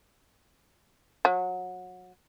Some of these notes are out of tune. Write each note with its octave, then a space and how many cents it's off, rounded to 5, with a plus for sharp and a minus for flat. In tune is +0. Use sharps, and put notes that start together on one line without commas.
F#3 -25